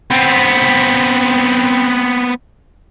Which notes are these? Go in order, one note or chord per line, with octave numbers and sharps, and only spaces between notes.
B3 C4